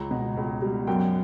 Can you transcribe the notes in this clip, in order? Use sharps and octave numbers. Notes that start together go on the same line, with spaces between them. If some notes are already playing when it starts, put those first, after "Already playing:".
Already playing: C#2 A#5
B2
C#2
G3
F#2 G5